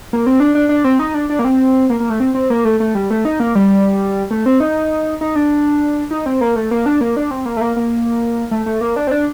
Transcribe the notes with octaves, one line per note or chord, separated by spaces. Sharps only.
A#3
C4
D4
D4
D4
C4
D#4
D4
D4
A#3
C4
A#3
A#3
A3
C4
C4
A#3
A3
A3
G3
A3
D#4
A#3
G3
A3
C4
D#4
D#4
D4
D#4
C4
A#3
A3
A#3
D4
A#3
D4
C4
A#3
A3
A#3
A#3
A3
A3
A#3
D4
C4
D4